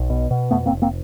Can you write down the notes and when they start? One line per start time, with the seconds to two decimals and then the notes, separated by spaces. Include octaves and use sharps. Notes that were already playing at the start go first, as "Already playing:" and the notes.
Already playing: B1
0.10 B2
0.31 B2
0.51 F2 A3 B3
0.66 A#3 C4
0.71 F1
0.82 A#3 C4